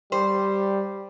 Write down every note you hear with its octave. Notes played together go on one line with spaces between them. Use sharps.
G3 C5